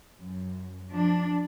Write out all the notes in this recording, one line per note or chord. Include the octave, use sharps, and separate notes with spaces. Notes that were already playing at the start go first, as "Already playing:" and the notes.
F#2
F3 D4